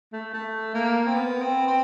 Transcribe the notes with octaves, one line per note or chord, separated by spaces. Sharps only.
A3
A3
A#3
C4
B3
C4
C4